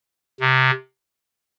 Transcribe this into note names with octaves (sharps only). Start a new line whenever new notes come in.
C3